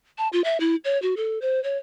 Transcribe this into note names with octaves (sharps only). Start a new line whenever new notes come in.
A5
F4
E5
E4
C#5
F#4
A4
C5
C#5